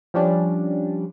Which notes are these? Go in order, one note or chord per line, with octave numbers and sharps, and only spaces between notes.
F3 G3 C#4 D4